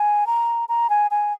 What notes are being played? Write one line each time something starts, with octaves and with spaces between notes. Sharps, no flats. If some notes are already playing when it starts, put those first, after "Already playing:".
Already playing: G#5
A#5
A#5
G#5
G#5